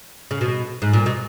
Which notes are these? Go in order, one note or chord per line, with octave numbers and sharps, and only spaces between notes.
C#3
B2
G#2
A#2
B2